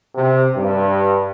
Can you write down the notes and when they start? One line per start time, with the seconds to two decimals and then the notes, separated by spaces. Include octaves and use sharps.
0.15 C3
0.56 G2